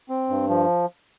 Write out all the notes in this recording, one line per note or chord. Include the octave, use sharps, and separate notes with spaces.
C4
G2
F3